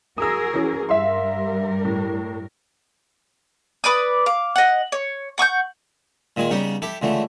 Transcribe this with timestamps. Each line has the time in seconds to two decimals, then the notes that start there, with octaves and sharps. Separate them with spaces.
0.18 F#4 G#4 A#4 D#6 E6
0.54 E3 C#4
0.89 G2 G3 A#4 E5 F5 C6
1.85 A2
3.84 B4 D5 D#6
4.26 F5 D6
4.56 D#5 F#5
4.92 C#5
5.38 F#5 C#6 D#6 G6
6.36 A#2 D#3 G#3 G#5
6.51 C#3 G3 B3 D#4
6.82 E4 G4 A4
7.02 C#2 D3 E3 A3